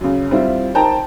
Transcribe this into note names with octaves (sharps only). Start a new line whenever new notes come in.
F#2 C#3
G3 C4 E4 F4
D#4 A#4 C5 G5 A5 A#5